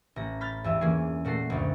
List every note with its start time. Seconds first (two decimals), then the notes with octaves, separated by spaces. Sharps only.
0.16 A1 A#5
0.41 B5 F6 G6 A6
0.64 E2 G2 E5
0.81 E3 A#3 C#4 G#4
1.25 A#2 A3 F#4 A4 C7
1.50 F#1 D2